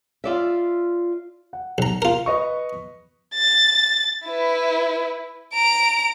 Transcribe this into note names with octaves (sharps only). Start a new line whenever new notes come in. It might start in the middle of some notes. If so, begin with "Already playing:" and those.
F4 D5 E5
F#5
B1 A#5
F4 A#4
B4 D#5 C#6
A6
E4 B4
A#5 D7